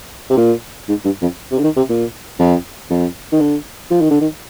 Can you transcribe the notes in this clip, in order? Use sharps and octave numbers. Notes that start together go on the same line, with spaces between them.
C3
A#2
G#2
G2
F2
C3
D3
D#3
C3
A#2
F2
F2
D#3
D3
F3
D#3
D3
D#3